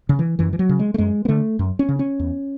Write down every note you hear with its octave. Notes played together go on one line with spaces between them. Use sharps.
C#3
E3
F#2 E3
E3
F#3
C#3
G#3
A3
F#2 G#3
B3
D3 A3
F#2
C#4
C#3
C#4
E2